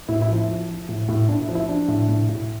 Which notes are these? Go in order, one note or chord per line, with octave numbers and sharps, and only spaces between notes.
A2 E4
E4
F3
E4
F3
F3
A2
A2
A2 D4
E4
F3
E4
F3 D4
A2
A2
A2